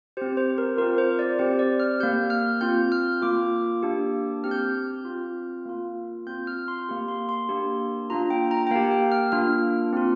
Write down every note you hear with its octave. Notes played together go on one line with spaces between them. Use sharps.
C4 G4 C5
C5
A#4
C4 F4 A#4
C5
D5
C4 G4 C5
D5
F6
A#3 G4 G6
F6
C4 F4 G6
F6
A#3 F4 D6
A#3 D4 G4
C4 G4 F6
G6
F6
C4 F4
A#3 F4
C4 F4 G6
F6
C6
A#3 G4
C6
C6
A#3 D4 G4
A#3 D4 F4 A#5
G5
A#5
G5
A#3 G4 F5
G5
F6
A#3 D4 F4 F6
C4 F4